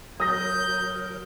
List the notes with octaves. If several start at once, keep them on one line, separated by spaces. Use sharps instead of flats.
F#3 A#4 D#6 G6 A#6